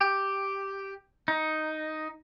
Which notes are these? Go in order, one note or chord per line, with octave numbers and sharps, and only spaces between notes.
G4
D#4